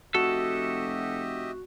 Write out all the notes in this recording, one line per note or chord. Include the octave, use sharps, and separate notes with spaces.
F1 F#4 G4 A4 D#5 E5